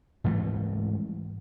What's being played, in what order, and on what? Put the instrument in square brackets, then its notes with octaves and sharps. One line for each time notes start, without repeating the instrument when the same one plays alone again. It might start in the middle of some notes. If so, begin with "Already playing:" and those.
[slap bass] G#2 E3 G3 A3